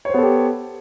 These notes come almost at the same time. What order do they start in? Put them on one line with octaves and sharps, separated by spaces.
C#5 C5 B3 A4 G4